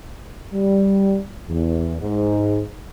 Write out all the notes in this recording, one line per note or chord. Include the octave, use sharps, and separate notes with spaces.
G3
E2
G#2